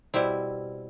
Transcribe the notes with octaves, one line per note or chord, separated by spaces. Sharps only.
B2 G3 C4 E4